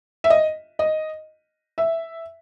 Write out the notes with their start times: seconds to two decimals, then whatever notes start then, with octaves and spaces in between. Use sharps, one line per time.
0.24 E5
0.30 D#5
0.79 D#5
1.78 E5